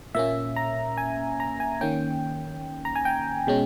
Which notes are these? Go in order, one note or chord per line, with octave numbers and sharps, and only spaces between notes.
A#2 A#3 C#4 E5
A#5
G#5
A#5
G#5
D#3 A#3 C#4 G5
A#5
G#5
G5
B2 G#3 C#4